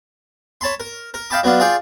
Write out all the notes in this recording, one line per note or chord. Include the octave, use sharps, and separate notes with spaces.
C#5 A5 B5 C6
A#4
A#4
D#5 F5 G5 A5 B5 D6
F#3 B3 D4 F4
F4 G#4 D5 G5